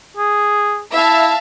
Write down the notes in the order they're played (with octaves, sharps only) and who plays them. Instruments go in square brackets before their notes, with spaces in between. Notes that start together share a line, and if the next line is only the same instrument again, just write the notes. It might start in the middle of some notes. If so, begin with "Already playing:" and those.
[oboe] G#4
[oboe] E4 [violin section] E5 F5 A5